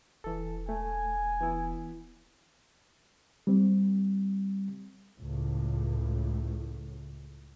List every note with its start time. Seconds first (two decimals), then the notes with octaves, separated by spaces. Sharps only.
0.24 E1 E3 A4
0.69 A3 G#5
1.41 E3 B3 E4
3.47 G3 C4
5.18 C#2 A2